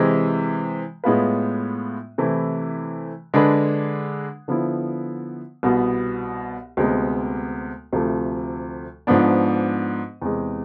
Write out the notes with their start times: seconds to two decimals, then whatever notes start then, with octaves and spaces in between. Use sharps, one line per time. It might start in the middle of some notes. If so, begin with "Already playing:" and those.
Already playing: C3 E3 G#3
1.04 A2 G#3 B3 F4 B4
2.18 C3 E3 A3 E4 B4
3.34 D3 G#3 D4 G#4 B4
4.48 D3 F3 B3 E4
5.63 C2 B2 B3
6.77 D2 C3 G#3 B3
7.93 D2 C3 F3 A3
9.07 G#2 F3 B3 D4
10.22 E2 C3 G#3